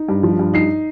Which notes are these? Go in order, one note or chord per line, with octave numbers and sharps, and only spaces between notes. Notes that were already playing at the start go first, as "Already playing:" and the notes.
Already playing: D#4
G2
F3
G2
D#4 C7